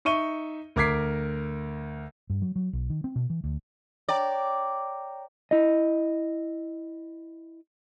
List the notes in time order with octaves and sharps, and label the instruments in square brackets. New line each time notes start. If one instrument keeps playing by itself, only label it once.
[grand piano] D#4 E5 C#6 D#7 G7
D2 A#4 D6 G#6 B6 C7
[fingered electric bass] G2
F#3
F#3
B1
D#3
C4
B2
E3
D2
[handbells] C#5 G5 A#5 [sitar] D5
[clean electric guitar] E4 D#5